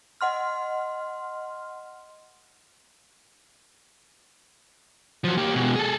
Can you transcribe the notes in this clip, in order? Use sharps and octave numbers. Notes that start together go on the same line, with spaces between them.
D#5 F#5 C6 F6
F3 F#3
A#3 G4
B2 G#3
G#4 A4